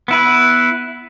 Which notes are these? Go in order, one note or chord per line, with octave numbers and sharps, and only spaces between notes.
B3 E4 B4